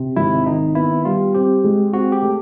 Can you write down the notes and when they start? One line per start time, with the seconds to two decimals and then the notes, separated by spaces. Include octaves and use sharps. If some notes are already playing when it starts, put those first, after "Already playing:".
Already playing: C3
0.16 G#1 E4
0.46 D#3 D#4
0.75 B3 E4
1.05 G3 F4
1.34 C4 G4
1.64 G#3
1.93 C4 F#4
2.12 G4
2.23 A3